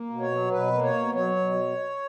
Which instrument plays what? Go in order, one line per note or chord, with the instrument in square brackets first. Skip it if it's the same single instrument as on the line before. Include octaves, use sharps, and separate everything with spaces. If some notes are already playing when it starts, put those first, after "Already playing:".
Already playing: [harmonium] A#3
B2
C#5
F#3
B2 B4
A#3
C#5
B2
F#3 C#5
B2